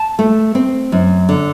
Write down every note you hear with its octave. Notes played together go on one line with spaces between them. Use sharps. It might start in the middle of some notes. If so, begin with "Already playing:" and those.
Already playing: A5
A3
C4
F#2
D3